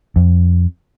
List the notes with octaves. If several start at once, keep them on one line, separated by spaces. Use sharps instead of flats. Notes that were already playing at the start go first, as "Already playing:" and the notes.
F2